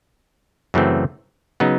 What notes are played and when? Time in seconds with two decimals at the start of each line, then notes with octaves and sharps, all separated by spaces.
0.74 F#2 C#3 E3 A3 C4
1.60 C#3 F#3 B3 D#4